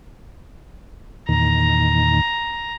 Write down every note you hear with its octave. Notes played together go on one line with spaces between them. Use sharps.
E2 A#2 D#3 A#5